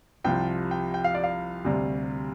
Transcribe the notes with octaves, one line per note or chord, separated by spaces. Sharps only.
C2 C3 F3 G5
G5
G5
F5
D5
F5
D2 C3 G3